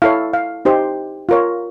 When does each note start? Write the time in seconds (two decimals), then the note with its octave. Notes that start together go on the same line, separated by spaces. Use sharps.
0.02 E4 A4 C#5 F5
0.33 F5
0.65 D#4 G4 C5
1.29 F4 A#4 C#5